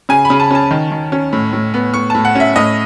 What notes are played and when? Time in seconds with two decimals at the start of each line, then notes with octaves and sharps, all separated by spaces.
0.09 C#3 G#5
0.25 B5
0.30 C#3
0.40 A5
0.51 C#4 A5
0.71 D#3
0.91 D#3
1.12 C#4
1.33 A2
1.53 A2
1.74 B3
1.94 A2 C#6
2.10 A2 A5
2.25 F#5
2.35 C#4 E5
2.56 A2 D#5